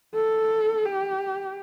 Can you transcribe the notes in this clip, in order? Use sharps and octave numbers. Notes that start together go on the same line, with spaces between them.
A4
G4